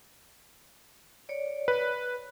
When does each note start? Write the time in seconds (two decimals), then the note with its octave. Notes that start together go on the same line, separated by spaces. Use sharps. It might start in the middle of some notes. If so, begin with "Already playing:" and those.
1.29 C#5 D5
1.68 B4